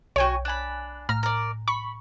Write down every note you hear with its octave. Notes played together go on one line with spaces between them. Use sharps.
B1 F#4 C#5 G5 G#5 C#6
D4 G#5 B5 F#6
A2 A#5 F6
A#4 D5
B5 C#6